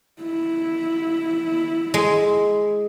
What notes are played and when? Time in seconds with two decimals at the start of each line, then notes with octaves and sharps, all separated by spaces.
0.22 E4
1.94 G#3